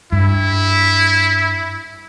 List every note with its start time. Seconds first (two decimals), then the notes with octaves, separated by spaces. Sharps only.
0.12 G2 E4